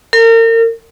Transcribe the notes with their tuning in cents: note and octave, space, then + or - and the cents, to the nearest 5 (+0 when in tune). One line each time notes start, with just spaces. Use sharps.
A#4 -35